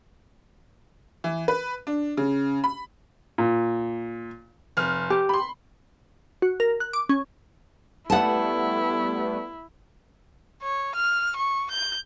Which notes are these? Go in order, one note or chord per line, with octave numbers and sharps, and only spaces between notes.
E3
B4
D4
C#3
B5
A#2
F1 F6
G4
B5 C6
F#4
A#4
F#6
D6
C#4
G3 A3 B3 E4 F#5 A5
C#5
F6
C#6
G6